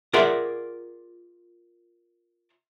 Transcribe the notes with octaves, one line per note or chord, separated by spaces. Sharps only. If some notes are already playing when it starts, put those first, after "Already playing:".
F4 G#4 A#4 D5 E5 F#5